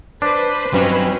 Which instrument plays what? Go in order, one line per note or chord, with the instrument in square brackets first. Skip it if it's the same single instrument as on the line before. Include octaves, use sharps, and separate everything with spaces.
[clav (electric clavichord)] D4 [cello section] B4 C5
[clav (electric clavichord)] G2 [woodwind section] D#3 C4 C#4 [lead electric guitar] F#3